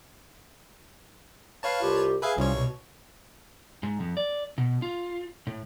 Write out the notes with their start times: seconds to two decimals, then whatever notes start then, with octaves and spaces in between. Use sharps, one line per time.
1.63 B4 C#5 F5 A5
1.81 C2 F4 G4
2.22 G#4 B4 E5 F5
2.37 C2 F3 G3 C#4 C#5
2.54 B2
3.83 G#2
4.00 F2
4.17 D5
4.58 B2
4.82 F4
5.47 A2